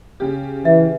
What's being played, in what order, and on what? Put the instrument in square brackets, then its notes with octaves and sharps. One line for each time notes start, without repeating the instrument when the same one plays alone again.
[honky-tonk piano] C#3 G4
[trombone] E3 [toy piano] E5